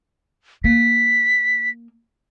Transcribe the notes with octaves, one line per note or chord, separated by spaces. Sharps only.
A#3 B6